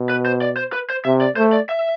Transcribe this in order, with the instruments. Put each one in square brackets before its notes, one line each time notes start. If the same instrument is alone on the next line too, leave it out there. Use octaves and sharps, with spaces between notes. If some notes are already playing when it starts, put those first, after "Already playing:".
Already playing: [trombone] B2
[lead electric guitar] B4
C5
D5
C5
B4
C5
[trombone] C3 [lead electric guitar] E5
[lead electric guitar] D5
[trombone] A3 [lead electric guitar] C5
[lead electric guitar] D5
E5